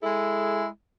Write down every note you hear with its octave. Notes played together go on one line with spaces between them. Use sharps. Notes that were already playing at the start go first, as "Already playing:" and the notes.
G#3 E4 G#4 A4